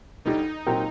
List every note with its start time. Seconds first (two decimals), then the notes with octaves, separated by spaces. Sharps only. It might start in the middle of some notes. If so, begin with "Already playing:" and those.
0.25 D2 D3 G3 D4 D#4
0.66 A#2 F#3 C4 G4 A#4